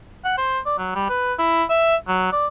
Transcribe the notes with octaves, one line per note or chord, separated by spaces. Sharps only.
F#5
C5
D5
F#3
G3
B4
E4
E5
F#3
D5